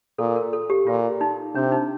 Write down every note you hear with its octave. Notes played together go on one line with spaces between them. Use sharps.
A#2 A4
A#4
A4
G4
A#2 F4
D#4
C3 D4
D#4